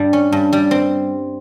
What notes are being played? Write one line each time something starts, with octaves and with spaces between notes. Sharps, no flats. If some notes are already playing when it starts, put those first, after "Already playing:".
Already playing: G2 G3
C#4
G2
G3
C4